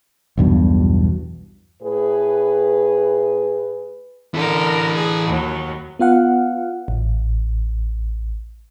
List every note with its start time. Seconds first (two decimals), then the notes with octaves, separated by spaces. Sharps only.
0.37 B1 E2 G2 B2
1.83 A2 G#4 B4
4.34 D3 E3 A4 A#4
4.94 G#4
5.27 D#2 F#3
5.99 B3 F4 F5 F#5
6.88 A1